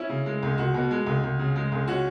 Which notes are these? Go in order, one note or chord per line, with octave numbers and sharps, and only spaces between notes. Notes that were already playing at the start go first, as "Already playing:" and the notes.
Already playing: C#4 E4
C#3
G#3
C#2
C#2 F#4
B2
G#3
C#2
C#2
C#3
G#3
C#2
C#4 F#4